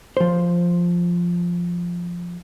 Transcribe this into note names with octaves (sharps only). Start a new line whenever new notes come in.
F3 C5